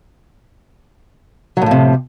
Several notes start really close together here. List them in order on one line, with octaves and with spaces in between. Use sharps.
F#3 A2 F3 C3